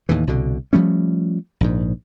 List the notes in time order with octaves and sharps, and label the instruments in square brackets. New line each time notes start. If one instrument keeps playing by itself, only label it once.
[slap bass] D#2 A2 E3
C2 B2 D3
F3 G3 A3 C#4
A#1 G#2